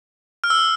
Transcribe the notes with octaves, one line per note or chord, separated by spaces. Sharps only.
F6
E6